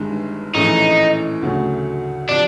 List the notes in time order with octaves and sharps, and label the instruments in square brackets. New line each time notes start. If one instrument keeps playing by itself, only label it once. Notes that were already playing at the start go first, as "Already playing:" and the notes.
Already playing: [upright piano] G1 G2 D#3 G#3
[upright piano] A#1 A2 E3 A3 C#4 [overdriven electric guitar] D#4
[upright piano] D2 C#3 F#3 A3 C#4
[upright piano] C3 F3 [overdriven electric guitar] D4